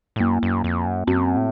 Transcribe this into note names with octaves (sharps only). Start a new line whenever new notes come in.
A2
F#2 A#3
F#2
F2
F#2
F#2 C4
A2